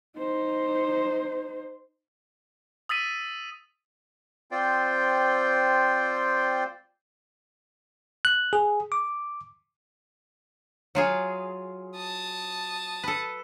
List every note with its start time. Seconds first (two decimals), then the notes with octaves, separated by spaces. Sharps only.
0.16 D#4 C5
2.89 D#6 E6 A6 B6 D#7
4.51 C4 F4 C5 D5 G5
8.25 F#6
8.53 G#4
8.92 D6
10.95 F#3 F4 G#4
11.96 A5 D#6
13.03 A4 B4